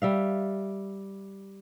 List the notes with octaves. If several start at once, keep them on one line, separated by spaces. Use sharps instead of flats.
G3 E5 F5